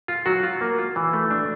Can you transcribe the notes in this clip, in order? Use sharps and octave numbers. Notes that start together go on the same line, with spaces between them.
F4
F#3 F#4
F4
A#3
F4
E3
A3
D4